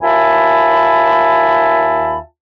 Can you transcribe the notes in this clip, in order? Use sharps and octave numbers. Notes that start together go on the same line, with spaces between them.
D#2 F4 E5 G#5 A5 B5